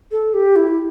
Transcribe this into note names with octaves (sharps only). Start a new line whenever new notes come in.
A4
G4
E4